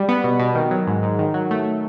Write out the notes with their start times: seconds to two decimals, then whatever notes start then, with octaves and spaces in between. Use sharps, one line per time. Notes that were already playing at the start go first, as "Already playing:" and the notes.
Already playing: G3
0.09 B3
0.24 B2
0.39 B2
0.55 D#3
0.71 F#3
0.87 G#2
1.03 G#2
1.19 D#3
1.34 F#3
1.51 A3